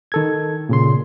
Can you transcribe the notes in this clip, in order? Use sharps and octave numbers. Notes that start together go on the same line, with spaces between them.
D#3 A4 G#6
A#2 C#3 C6